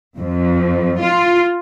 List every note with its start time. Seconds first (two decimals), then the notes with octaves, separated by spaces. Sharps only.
0.17 F2
1.02 F4